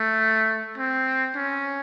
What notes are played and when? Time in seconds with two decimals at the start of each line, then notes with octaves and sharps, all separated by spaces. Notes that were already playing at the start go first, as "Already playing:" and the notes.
Already playing: A3
0.78 C4
1.36 C#4